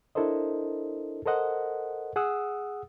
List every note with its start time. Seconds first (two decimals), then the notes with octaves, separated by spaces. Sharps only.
0.15 D4 E4 A4 A#4 C5 D#5
1.26 A4 A#4 C5 D#5 F#5
2.16 G#4 F#5 D#6 E6